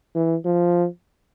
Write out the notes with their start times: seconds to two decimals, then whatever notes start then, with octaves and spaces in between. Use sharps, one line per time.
0.15 E3
0.45 F3